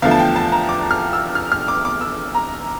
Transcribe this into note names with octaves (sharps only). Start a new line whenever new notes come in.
E2 D3 F3 A3 F5
A5
G5
A5
A#5
D6
F6
E6
F6
F6
D6
D6
E6
A#5